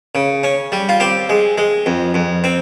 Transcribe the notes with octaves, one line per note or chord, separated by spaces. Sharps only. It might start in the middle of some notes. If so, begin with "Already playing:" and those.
C#3
C#4
G3
F4
C4 G4
G#3
G#3
F2
F2
C4